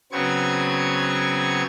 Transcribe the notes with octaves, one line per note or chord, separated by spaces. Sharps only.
C#3 F#3 B3 C4 C#6 G#6